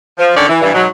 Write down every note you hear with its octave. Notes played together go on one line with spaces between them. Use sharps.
F3
D3 D#3 C#4 C#5 D5
E3
G2 E3
G#2 B2 F#3